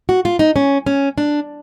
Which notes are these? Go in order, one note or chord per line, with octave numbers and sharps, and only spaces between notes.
F#4
F4
D#4
C#4
C#4
D4